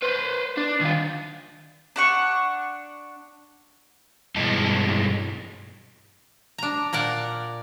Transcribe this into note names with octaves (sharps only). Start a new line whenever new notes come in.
B4 C5
D4
D#3 F4
D4 F#5 C#6
G2 B2 E3 G#3 D#4 A5
D4 A#5
A#2 A#4 D5 F#5